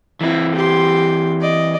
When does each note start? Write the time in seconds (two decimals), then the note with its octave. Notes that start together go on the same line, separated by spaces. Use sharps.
0.21 E3 C4 E4
0.55 G4 C6
1.41 D5 D#5